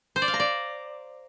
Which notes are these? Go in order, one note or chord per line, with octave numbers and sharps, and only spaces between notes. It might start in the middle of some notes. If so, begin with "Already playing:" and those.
C5
D5
F5
A#5
D5